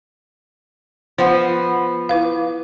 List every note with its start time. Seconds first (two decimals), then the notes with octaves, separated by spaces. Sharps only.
1.18 F3 B3 C5 F#5
2.09 E4 B4 F5